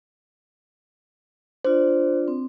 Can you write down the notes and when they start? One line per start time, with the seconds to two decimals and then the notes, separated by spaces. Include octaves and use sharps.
1.65 D4 F4 C5 D5
2.28 C4